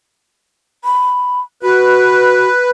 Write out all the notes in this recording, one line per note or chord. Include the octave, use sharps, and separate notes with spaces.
B5
F#4 B4